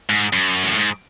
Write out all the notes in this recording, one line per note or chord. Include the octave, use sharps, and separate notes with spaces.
G#2
F#2
A2
G#2